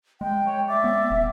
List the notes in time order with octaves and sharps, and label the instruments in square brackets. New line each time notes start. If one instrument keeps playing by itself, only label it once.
[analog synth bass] G#3 [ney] G5
[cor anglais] C#5
[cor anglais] D5 [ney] E5
[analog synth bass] B3
D#1